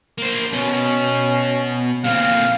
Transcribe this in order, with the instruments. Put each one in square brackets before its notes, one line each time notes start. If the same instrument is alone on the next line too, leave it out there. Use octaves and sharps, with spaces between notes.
[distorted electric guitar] A#3 C5
[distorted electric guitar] B2 [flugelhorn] C#4
[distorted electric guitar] A#2 C4 [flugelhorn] F5